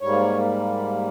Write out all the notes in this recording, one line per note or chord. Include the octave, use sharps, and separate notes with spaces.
G#2 G3 A#3 C#5